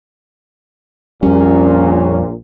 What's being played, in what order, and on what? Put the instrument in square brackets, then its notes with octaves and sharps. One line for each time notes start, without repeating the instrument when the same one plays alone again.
[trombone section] A#1 A#2 [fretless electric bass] F2 G3 [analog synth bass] C#4